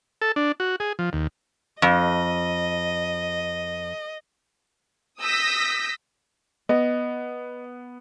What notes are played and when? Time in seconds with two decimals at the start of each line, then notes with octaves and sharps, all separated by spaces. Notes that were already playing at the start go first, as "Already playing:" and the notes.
0.22 A4
0.36 D4
0.60 F#4
0.80 G#4
0.99 F3
1.13 D#2
1.82 F2 D#5
5.20 D#6 E6 G6 A#6 B6
6.69 B3 D#5